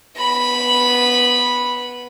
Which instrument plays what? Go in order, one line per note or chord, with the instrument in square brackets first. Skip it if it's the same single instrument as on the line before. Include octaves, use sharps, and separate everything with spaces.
[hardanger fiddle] B3 B5